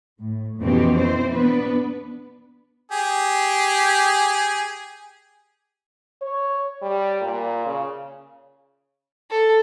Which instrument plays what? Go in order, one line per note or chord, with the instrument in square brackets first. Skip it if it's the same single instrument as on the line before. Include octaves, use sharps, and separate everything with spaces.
[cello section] A2
F2 B2 E3 C4 C#4 G4
E3 C4 C5
B3 D4 B4
[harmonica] G4 G#4
[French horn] C#5
G3
A#2
C#3
[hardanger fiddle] A4